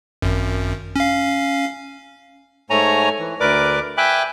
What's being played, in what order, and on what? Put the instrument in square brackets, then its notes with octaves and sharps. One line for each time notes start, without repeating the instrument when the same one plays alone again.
[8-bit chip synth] G#1 F#2
C#4 F5
[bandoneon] G#2 A3 C#5 G#5 A#5
E3
D2 A#4 B4 D5 D6
E5 G5 G#5 B5 D6 F#6